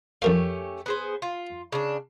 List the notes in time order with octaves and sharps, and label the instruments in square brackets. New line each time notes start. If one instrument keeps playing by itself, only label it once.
[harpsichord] F2 A#4 F5 [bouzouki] A3 C#4 G4
[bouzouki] B3 G#4 C5
F4
C#3 D4